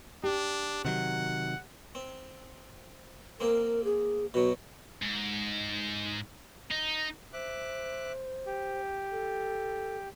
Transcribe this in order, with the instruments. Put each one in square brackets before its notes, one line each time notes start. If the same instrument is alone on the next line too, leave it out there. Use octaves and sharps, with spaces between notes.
[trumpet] D4 [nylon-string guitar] G4
[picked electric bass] C3 D#3 F#3 [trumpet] F#5
[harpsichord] C4
[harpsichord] A#3 C4 [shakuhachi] A#4
[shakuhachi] G#4
[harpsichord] B2 F#3 [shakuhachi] F#4
[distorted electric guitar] G#2
D#4
[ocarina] C5 [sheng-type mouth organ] E5 D6 F#6
[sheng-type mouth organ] G4
[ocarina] A4